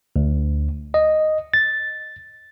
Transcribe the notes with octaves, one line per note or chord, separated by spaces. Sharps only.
D2
D#5
A6